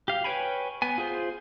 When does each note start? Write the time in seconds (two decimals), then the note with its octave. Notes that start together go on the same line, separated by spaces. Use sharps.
0.08 G4 F5
0.24 B4 C#5 G5 G#5 B5
0.82 B3 G#5
0.98 F4 G#4 C5